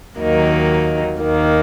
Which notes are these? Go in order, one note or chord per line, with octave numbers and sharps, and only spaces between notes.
D#2 D#3 F#3 A#3 D#4
D#2 D#3 A#3